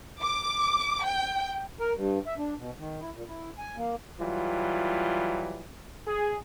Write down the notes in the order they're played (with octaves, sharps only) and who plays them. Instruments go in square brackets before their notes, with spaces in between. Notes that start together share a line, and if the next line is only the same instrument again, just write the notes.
[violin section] D6
G5
[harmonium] A#4
G2
E5
D4
B2
D#3
E4
A#2
E4
G#5
A#3
[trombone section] E3 F#3 G3 F4
G#4